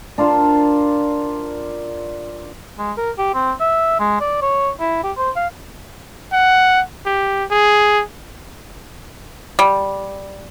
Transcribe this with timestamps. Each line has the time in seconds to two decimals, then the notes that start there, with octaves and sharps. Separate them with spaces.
0.18 D4 F4 A#4 C5
2.78 G#3
2.97 A#4
3.18 G4
3.34 C4
3.60 E5
4.00 G#3
4.21 D5
4.42 C#5
4.80 E4
5.04 G4
5.17 C5
5.36 F5
6.33 F#5
7.06 G4
7.51 G#4
9.59 G3